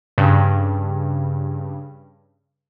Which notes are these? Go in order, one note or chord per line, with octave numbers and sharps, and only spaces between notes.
G2 C#3